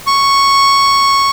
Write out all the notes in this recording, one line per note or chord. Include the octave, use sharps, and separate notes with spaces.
C#6